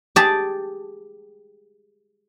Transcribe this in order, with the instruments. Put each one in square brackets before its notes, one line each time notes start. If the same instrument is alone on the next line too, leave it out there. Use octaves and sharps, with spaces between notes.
[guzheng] G4 G#4 A5